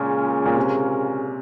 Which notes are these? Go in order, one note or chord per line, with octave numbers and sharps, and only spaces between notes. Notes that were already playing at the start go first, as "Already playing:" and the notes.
Already playing: A#2 C#3 G#3 C#4 F4 A#4
A#2
C3